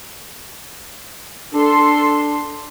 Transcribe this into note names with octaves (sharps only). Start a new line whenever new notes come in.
D4 A4 C6